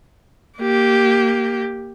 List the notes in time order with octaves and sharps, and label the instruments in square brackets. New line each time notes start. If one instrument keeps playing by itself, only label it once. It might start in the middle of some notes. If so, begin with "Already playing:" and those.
[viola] A#3 G4